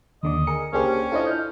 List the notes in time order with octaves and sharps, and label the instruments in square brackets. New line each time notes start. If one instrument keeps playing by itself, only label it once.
[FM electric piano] D#2 D3 D5 [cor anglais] D#5
[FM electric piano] G#4 A#4 C#7
[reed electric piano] C#2 G#4 C5 [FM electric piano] A#3 D4 G4 [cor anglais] C#4
[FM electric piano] D4 E4 F4 [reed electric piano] A4 C5 D#5
[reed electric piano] F6 G6